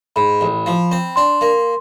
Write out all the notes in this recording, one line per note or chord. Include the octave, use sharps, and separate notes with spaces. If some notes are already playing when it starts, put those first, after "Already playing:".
G#2 B5
A1
F3
C4
D4 C6
A#3